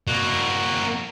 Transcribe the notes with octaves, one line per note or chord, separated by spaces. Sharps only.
A#3 F#4